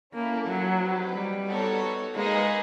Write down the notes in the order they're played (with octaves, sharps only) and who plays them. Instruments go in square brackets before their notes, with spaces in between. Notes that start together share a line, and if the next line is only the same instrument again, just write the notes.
[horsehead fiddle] A#3 [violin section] C#4 E4 A4
[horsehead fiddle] F#3
[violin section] C4 D#4 G4 B4
[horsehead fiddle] G3
[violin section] B3 D#4 F#4 A4 C#5
[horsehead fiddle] G#3 [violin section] A#3 D#4 G#4 B4 D#5